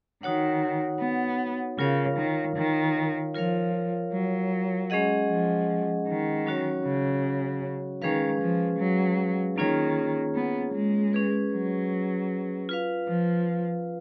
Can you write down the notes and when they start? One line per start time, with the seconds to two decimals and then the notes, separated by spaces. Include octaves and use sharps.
0.23 D#3 D#4 F#4 C#5 F#5
1.00 B3
1.78 C#3 F4 A#4 C#5 F5
2.17 D#3
2.56 D#3
3.35 F3 F4 A#4 C#5 F5
4.13 F#3
4.90 G#3 C#4 G#4 D#5 F#5
5.29 F3
6.07 D#3
6.46 F#3 C#4 F#4 C#5
6.84 C#3
8.02 D#3 G#3 C#4 G#4 B4 F5
8.41 F3
8.79 F#3
9.57 D#3 A#3 C#4 F4 G#4 C#5
10.35 B3
10.74 G#3
11.13 C#4 G#4 B4
11.53 F#3
12.69 F4 B4 F5
13.08 F3